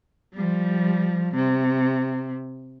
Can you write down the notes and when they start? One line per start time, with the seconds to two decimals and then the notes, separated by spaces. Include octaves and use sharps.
0.34 F3 G3
1.35 C3